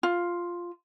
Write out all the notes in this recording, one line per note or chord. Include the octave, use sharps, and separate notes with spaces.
F4